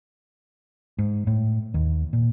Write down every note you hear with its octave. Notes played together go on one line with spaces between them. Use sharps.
G#2
A2
D#2
A#2